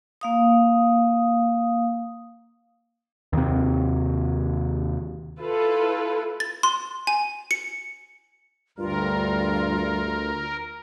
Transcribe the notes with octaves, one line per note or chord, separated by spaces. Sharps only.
A#3 F5 D#6
D#2 C3
E4 F4 A4 B4
A6
C6
G#5
C#7
D2 G2 F4 A#4